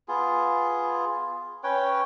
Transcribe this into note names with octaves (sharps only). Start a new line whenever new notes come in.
B3 F4 G#4
C#4 B4 C#5 G5